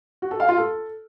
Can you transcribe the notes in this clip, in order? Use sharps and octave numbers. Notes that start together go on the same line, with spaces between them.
F#4
A4
F5
F4
A4